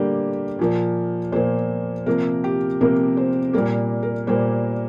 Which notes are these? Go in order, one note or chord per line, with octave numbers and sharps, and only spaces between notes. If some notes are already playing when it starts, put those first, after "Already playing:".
Already playing: D3 G3 A#3 G4
A#2 F3 A#3
A#2 F3 A#3 C5
C3 F3 A#3 A#4
G4
C3 F3 A#3 A#4
C5
A#2 G3 A#3 A#4
A#4
A#2 G3 A#3 C5